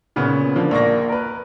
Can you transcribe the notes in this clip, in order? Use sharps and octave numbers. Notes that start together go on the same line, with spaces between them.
A#2 C#3 B3
D3 F3 A#3
A#1 A#3 C#6 A#6
A#4 B4